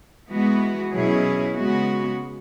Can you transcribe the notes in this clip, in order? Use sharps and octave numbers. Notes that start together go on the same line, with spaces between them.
E3 G#3 B3 F#4
B2 F#3 C#4 E4 G#4
C#3 G#3 B3 F#4